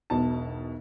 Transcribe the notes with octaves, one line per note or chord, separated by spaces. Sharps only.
E1 B1 B2 A5